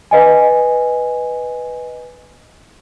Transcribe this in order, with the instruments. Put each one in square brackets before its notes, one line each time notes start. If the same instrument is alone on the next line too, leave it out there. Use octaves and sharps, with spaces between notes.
[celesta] B4 D#5 G#5